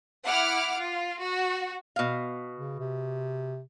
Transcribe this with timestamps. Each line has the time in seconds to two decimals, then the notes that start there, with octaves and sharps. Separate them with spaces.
0.24 E4 F#5 D6 F6
0.79 F4
1.22 F#4
1.96 B2 F5
2.56 C#3
2.80 C3